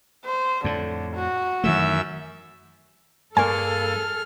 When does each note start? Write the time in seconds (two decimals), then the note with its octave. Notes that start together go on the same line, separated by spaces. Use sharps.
0.26 C5
0.64 F2 A2 D3
1.16 F#4
1.64 F#2 D#3 E3 A3 E5 E6
3.37 G2 A#3 G#4 A4 G#5 F6